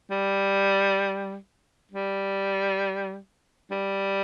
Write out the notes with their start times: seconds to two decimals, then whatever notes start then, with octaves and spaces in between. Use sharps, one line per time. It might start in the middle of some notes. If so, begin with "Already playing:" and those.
0.11 G3
1.91 G3
3.71 G3